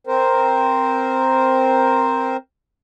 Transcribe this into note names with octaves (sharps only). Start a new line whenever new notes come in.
C4 A#4 C5